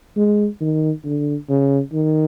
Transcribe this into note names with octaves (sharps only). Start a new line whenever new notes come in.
G#3
D#3
D3
C#3
D#3